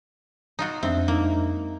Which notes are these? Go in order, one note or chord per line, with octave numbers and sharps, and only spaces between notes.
D#4 F4 F#4
F2 G#3 C4 D4 E5
A#3 D#4